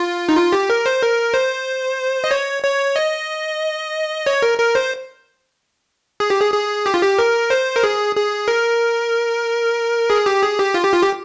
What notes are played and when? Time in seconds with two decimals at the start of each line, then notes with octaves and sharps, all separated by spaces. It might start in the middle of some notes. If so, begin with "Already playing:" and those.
Already playing: F4
0.29 D#4
0.37 F4
0.52 G4
0.70 A#4
0.86 C5
1.02 A#4
1.34 C5
2.24 D#5
2.31 C#5
2.64 C#5
2.96 D#5
4.26 C#5
4.42 A#4
4.59 A#4
4.75 C5
6.20 G#4
6.30 G4
6.42 G#4
6.54 G#4
6.86 G4
6.94 F4
7.03 G4
7.19 A#4
7.50 C5
7.76 A#4
7.84 G#4
8.16 G#4
8.48 A#4
10.10 G#4
10.26 G4
10.42 G#4
10.59 G4
10.74 F4
10.84 G4
10.93 F4
11.02 G4